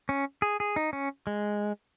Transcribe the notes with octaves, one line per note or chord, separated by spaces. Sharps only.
C#4
G#4
G#4
D#4
C#4
G#3